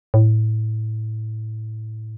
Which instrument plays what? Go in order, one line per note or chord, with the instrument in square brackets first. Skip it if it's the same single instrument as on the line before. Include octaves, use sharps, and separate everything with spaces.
[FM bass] A2